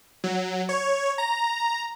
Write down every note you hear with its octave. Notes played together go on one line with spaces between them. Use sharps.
F#3
C#5
A#5